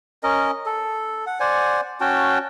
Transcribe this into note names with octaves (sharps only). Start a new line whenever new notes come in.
C#4 A#4 D#5
A4
F#5
C5 D5 F#5 G#5
C#4 F#4 G5 A5